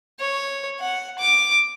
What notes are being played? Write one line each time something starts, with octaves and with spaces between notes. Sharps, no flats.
C#5
F#5
D6